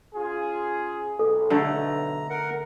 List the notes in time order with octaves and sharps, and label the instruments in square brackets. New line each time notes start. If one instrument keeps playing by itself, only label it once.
[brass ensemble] C#4 F4 G#4
[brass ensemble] B1 [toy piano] A4
[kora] D3 A3 [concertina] A#5
[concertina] A#4 F#5